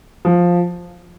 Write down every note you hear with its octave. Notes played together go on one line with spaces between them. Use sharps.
F3